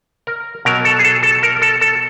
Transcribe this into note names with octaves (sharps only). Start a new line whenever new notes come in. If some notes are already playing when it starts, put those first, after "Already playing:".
A#4
B2 F#3 A#4
A4
G#4
A4
A4
A#4
A4
A4